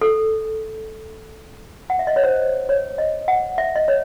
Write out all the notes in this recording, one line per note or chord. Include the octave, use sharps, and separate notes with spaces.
A4
F#5
E5
D#5
C#5
C5
C#5
D#5
F#5
E5
D#5
C#5